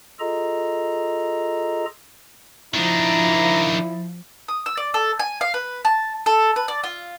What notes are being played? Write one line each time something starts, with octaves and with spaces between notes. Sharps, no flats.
F4 G#4 A4 D#5 A#5
D#3 F3 D4 E4 A#5
D#6
E6
D5
A4
G#5
F5
B4
A5
A4
B4
D5
F4